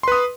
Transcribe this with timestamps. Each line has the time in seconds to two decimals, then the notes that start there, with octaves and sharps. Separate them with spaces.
0.03 C6
0.08 B4
0.12 D#6